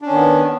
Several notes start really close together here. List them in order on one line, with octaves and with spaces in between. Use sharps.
D4 C#4 D#3 B3